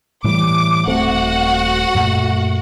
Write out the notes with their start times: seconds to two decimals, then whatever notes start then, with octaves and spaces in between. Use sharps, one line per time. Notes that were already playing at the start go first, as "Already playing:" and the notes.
0.24 A2 E3 G3 D6
0.87 D#1 A3 C4 F#4 F#5
1.95 F#2 A#2 A3